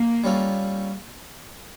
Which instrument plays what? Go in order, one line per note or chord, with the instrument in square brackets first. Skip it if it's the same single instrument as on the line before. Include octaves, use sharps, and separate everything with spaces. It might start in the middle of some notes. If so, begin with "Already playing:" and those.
Already playing: [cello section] A#3
[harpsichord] G3 C#4 F4 A4